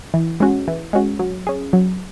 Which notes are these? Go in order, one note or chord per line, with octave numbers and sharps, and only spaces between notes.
E3
G#3 C#4 F#4
E3
G#3 C#4 F#4
F#3
C#4 G#4
F#3